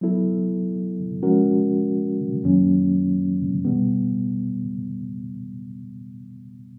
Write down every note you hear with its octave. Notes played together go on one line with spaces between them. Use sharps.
F#3 B3 E4 A4
F3 G#3 C#4 F#4 A#4
F#2 D#3 F#3 A#3 C#4
B2 G3 B3